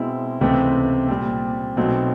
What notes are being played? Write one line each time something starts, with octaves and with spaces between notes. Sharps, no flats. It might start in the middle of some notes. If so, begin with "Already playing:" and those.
Already playing: B2 G#3 C4 E4
C#2 C3 E3 A3 C4
A#2 G3 C4
B1 B2 F#3 A3 C4